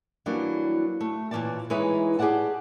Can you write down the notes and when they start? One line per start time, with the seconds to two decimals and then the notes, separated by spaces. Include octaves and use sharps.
0.26 E3 F#3 G3 A#3 D4
1.01 A3
1.31 A#2 E3 B3 C#5 D5 A5
1.70 E3 G#3 D#4 E4 B4 C#5
2.19 G4 G#4 A#4 D5 F#5 A5